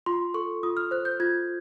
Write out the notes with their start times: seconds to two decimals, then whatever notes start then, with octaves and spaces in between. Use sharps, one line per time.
0.06 F4 C6
0.34 A4 C#6
0.63 F4 D#6
0.77 F6
0.91 C5 F#6
1.05 G6
1.20 F4 G#6